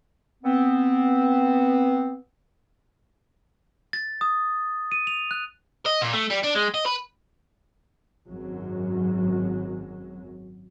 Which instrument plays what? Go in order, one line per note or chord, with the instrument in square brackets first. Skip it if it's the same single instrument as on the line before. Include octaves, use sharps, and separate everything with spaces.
[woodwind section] B3 C4
[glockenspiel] A6
D#6
D#7
F7
F#6
[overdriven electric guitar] D#5
A#2
A3
G3
D4
G#3
D#5
B4
[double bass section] G#1 F#2 F#3